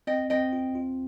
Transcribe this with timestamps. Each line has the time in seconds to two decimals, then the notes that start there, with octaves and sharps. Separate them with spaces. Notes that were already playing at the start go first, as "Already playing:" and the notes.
0.07 C4 D#5 G5
0.30 C4 D#5 G5
0.53 F4
0.75 F4